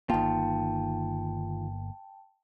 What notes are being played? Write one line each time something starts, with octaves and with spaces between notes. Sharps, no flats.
G1 D#3 A#3 F4 G5 A5